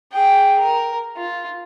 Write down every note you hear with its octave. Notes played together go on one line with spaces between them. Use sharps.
G#4 G5
A#4
F4